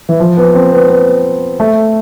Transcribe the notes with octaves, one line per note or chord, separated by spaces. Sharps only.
E3
F3
B3
C4
B3
B3
A3